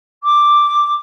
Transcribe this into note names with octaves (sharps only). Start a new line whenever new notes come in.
D6